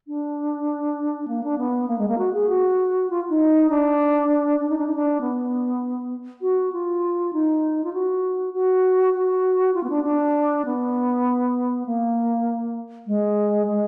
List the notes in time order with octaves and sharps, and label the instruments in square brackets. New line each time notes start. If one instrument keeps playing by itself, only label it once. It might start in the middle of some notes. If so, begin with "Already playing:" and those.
[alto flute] D4
A#3
D4
B3
A#3
G#3
A#3
F#4
G#4
F#4
F4
D#4
D4
D4
D#4
D4
D#4
D4
B3
F#4
F4
D#4
F4
F#4
F#4
F#4
F4
B3
D4
D4
B3
A#3
G#3
G#3